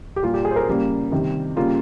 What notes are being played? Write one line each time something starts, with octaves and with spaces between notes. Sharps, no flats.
G4
A#2 G3 A#3 F4
G4
G#4
C5
A#4
C#3 G3 A#3
C3 D#3 G3
C#3 G3 A#3 F4